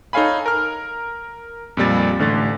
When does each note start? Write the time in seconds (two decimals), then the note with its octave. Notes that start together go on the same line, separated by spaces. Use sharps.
0.13 D#4 A4 C#5 F5 G#5 B5
0.46 A#4 F6
1.77 F2 A#2 G3 A6
2.19 A1 D3 A3 A6